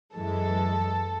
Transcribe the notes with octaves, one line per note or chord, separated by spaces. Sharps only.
F#2 E3 G#3 A4